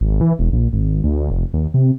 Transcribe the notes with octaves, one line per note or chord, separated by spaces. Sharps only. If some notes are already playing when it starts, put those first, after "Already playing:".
G#1
E3
E1
A#1
G#1
D2
F1
D#2
C3